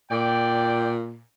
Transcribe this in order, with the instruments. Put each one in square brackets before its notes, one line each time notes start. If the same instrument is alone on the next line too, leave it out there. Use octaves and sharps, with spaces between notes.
[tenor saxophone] A#2 [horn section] D5 G5